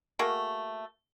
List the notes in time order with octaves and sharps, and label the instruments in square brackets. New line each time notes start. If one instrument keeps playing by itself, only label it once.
[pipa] A3 A#3 F#4 G#4